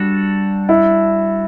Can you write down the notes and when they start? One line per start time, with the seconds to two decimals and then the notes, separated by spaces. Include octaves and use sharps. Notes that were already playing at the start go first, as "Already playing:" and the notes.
Already playing: G3 D4 F#4 A4
0.69 E4